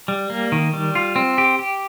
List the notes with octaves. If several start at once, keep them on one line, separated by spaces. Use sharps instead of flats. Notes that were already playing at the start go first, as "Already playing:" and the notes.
G3
A#3
D#3
G3
F4
C4
G4
G4